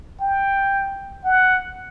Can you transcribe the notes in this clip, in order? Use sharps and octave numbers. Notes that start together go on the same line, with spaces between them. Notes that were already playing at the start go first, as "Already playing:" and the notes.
G5
F#5